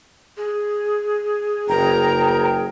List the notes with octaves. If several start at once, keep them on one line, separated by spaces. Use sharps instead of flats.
G#4
F#1 A#4 G5 A#5